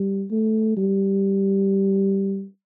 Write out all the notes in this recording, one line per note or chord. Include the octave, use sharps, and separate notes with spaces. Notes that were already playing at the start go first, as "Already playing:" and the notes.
Already playing: G3
A3
G3